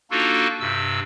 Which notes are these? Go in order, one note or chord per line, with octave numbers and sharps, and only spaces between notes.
A#3 D4 D#4 F4 F#4 A4
G2 C3 E6